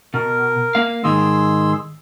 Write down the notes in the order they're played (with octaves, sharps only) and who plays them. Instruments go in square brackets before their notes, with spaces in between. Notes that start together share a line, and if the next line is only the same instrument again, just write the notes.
[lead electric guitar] B2 [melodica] A#4
[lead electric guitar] A#3 F5
[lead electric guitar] G#2 D#3 [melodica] G#4 C6 E6